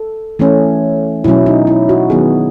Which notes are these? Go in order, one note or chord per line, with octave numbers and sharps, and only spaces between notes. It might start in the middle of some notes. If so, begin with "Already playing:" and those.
Already playing: A4
E3 A3 C#4
B2 F#3 C#4 E4
D#4
E4
F#4
D#3 F#3 B3 G#4